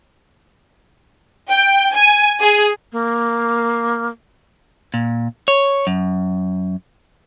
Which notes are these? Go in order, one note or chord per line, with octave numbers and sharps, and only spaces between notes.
G5
G#5
G#4
A#3
A#2
C#5
F#2